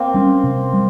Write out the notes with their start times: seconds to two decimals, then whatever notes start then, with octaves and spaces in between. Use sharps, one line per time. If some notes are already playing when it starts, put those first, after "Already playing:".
Already playing: A#3 C4
0.14 G3 C#4
0.44 C3
0.73 G3